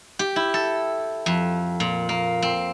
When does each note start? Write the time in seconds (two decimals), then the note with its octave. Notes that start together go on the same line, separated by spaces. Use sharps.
0.19 G4
0.36 E4
0.54 A4
1.26 F2
1.80 A#2
2.09 A#3
2.42 C4